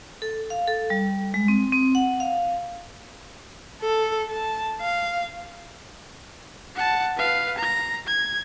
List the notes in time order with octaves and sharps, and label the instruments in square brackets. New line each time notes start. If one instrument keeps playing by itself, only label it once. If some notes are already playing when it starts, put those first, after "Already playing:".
[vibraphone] A4
F5
A4
G3
G#3
C4
C4
F#5
F5
[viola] A4
A5
F5
[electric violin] F#5 A5
B4 F5
A#5 A#6
G#6